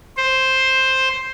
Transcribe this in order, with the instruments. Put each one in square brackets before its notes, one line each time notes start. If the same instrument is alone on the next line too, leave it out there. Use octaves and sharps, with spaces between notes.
[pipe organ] C5